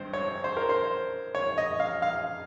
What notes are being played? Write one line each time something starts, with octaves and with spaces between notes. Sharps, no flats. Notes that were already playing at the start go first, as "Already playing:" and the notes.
Already playing: G#1 G2 C5
C#5
C5
A#4
C5
C#5
D#5
F5
F5